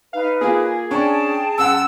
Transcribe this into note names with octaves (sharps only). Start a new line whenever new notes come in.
D#4 B4 F5
A#3 F4 G#4
C#4 D4 G5 A5
F#2 F#5 E6